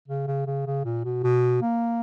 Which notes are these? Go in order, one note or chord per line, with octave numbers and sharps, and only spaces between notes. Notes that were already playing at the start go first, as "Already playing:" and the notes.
C#3
C#3
C#3
C#3
A#2
B2
B2
A#3